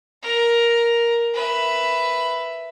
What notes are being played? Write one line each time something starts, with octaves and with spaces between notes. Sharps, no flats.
A#4
B4 E5